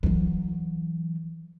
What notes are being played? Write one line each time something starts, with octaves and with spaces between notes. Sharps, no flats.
E3 F#3